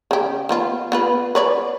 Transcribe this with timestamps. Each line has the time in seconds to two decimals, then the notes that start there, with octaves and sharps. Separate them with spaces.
0.11 C#3 G4
0.49 F3 B3 F4
0.92 B3 F4 B4
1.35 B4 C#5 D5